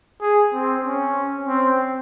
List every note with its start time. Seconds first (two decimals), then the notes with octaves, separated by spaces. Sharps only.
0.21 G#4
0.53 C4
0.84 C#4
1.48 C4